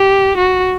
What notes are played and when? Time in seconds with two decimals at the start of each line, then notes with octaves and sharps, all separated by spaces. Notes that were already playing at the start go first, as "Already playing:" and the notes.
Already playing: G4
0.38 F#4